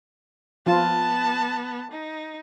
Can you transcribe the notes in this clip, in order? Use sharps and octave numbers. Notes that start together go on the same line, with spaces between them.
F3 B3 F4 A5
D#4